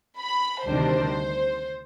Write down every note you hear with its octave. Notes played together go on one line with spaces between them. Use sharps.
B5
D2 C3 D#3 G3 D4 C5